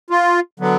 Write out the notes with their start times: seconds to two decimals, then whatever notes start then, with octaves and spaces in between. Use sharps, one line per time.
0.10 F4
0.60 D3 F#3 B3